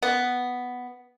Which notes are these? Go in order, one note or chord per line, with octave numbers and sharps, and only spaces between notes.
B3